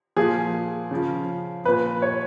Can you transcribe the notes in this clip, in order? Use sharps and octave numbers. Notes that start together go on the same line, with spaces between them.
A#2 F3 G#4
C#3 F3
A#2 F3 B4
C#5